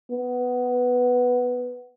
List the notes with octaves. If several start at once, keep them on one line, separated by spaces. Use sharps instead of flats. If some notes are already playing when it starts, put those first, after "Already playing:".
B3